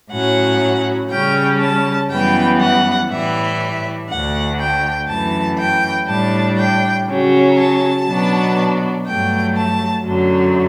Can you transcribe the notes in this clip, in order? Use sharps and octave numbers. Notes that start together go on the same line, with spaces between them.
A2 F#3 C#4 F#5
C#3 G3 C#4 G5
A5
F#2 E3 G3 B3 G5
F#5
A2 E3 G3 E5
D2 D3 A3 F#5
G5
F#2 E3 A3 A5
G5
A2 G3 D4 A5
G5
C#3 F#3 C#4
A5
B2 F#3 B3 D4
G2 F#3 A3 G5
A5
F#2 D3 F#3